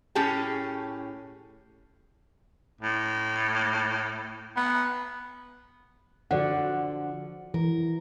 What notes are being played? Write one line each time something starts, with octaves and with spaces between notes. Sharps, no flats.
A2 C#4 G4 G#4 A5
A2
B3
D3 F3 F#4 D5 F#5
E3 A#4